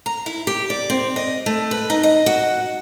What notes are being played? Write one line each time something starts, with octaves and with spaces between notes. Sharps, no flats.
A#5
E4
G4
D5
C4
D#5
A3
B4
D#4
D#5
F#4